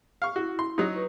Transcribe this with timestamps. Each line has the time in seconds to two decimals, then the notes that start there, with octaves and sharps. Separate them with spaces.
0.22 F5 C#6
0.36 E4 F#4
0.59 C6
0.78 F#3 D#4
0.93 B4 C#6